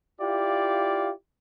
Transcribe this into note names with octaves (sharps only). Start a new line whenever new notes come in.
E4 F4 G4 D5 F5